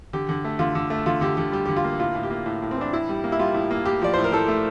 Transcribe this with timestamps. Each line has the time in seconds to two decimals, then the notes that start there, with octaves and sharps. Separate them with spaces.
0.13 D3 G4
0.29 D3
0.44 A3
0.59 D3 F4
0.75 D3
0.90 A3
1.06 D3 F4
1.21 D3 G4
1.37 D3 G4
1.52 G3 G4
1.65 D3 G4
1.76 F4
1.84 A#3
1.99 A2 F4
2.15 A2
2.23 G4
2.30 A#3
2.46 A2
2.62 A2
2.71 C4
2.77 E3 D4
2.93 A2 E4
3.09 G3
3.24 A#3
3.32 E4
3.39 G3 F4
3.54 A2
3.71 A#3
3.86 A2 G4
4.02 F3 D5
4.14 A2 C5
4.24 A#4
4.32 A2 A4
4.48 A3